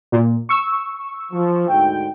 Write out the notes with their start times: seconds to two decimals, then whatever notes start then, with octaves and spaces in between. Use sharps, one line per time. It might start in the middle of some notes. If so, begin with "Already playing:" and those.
0.12 A#2
0.49 C#6 E6
1.32 F3
1.68 D2 G#2 G5